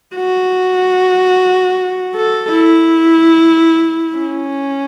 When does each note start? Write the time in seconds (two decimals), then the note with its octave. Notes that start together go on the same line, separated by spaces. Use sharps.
0.16 F#4
2.16 A4
2.50 E4
4.17 C#4